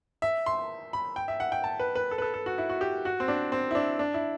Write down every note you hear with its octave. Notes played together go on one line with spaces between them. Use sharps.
E5
C6
B5
G5
E5
F#5
G5
A5
B4
B4
A4
B4
A4
A4
F#4
E4
F#4
G4
F#4
C4
D4
C4
E4
D4
D4
E4